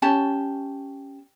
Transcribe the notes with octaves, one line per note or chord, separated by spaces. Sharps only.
C#4 G4 A5